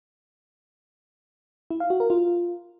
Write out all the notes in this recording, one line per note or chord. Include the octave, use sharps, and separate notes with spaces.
E4
F5
F#4
A#4
F4